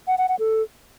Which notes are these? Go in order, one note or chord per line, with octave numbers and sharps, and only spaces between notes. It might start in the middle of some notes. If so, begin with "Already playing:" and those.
F#5
F#5
F#5
A4